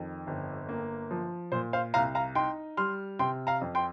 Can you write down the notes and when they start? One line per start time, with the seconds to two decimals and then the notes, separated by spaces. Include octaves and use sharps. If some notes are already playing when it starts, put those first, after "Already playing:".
Already playing: F2 D#3
0.27 G1
0.69 A#3
1.11 F3
1.52 A#2 C5
1.73 C5 F5
1.94 C2 F5 A#5
2.15 F5 A#5
2.35 D#4 G5 C6
2.77 G3 C6 F6
3.19 C3 G5 C6
3.47 F5 A#5
3.61 F2
3.75 G5 C6